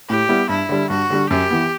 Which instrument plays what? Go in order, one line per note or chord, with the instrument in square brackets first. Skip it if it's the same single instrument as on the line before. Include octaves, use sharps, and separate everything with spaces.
[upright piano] A2 [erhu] G4
[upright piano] G3 B3 E4
[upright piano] G2 [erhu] E4
[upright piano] D3 G3
[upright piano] G2 [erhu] F#4
[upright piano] D3 G3
[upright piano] F#2 [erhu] G4
[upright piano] E3 B3